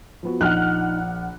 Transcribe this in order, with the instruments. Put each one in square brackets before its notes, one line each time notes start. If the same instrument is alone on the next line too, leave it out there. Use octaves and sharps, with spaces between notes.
[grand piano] F3 B3 F#4
[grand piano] A#1 [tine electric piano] D#4 [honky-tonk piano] F#5 F6 F#6